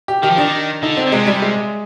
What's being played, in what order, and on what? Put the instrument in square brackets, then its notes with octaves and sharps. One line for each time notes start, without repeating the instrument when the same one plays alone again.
[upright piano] G4
[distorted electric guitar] D#3 [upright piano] G4
[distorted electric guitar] F3
[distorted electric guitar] D#3 [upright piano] D4
[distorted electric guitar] D3 [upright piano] D#4
[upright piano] C4
[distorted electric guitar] D3
[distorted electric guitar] C3 [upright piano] G#3
[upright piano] G3
G#3